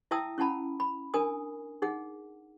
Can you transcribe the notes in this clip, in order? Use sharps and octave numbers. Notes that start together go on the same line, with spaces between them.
E4 E5 G5 A5 D#6 E6
C#4 E4 F#5 A5 B5
B5
D4 A#4 G#5 D#6
D#4 G#4 F#5